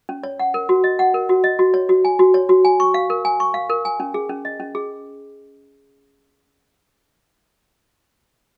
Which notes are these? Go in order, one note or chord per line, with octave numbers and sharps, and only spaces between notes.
C#4
C#5
F#5
A#4
F#4
D#5
F#5
A#4
F#4
D#5
F#4
C#5
F#4
G#5
F#4
C#5
F#4
G#5
C#6
F5
A#4
G#5
C#6
F5
A#4
G#5
C#4
G#4
C#4
D#5
C#4
G#4